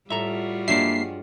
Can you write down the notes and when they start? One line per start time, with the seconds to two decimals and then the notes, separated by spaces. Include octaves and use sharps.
0.10 A2 G3 F4 F#4 A4 E5 A#5
0.68 G2 F#3 G#3 A#3 D4 E5 C7